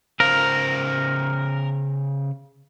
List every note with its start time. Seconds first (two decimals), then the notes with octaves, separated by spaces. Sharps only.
0.20 C#3 A#4 C5 F5